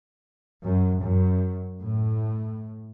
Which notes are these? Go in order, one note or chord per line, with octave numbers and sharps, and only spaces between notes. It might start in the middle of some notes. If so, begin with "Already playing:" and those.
F#2
F#2
A2